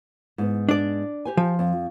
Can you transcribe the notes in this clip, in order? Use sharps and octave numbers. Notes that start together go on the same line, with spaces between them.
G#2 B3
D4 D5
G4 C5 G#5
F3
F2